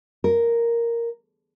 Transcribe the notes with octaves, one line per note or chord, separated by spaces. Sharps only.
A#4